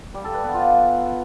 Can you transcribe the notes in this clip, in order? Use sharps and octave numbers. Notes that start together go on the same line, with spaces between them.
G3
A4
B4
B3
F4